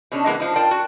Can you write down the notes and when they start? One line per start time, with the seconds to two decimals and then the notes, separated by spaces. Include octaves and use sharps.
0.12 B2 C#4 D4
0.26 C3 E3 G#3 A#3 B3
0.39 F3 D4 D#4
0.56 F4 A#4 D5 F5 G5 A5
0.71 F#4